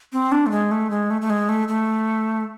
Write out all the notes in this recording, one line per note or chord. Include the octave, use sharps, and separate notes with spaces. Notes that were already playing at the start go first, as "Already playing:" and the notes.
C4
D4
A3
G#3
A3
G#3
A3
A3
G#3
A3
A3